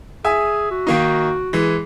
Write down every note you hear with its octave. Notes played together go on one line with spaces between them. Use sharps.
G#4 E5 G#5
F#4
D#3 A#3 D#4
E3 G#3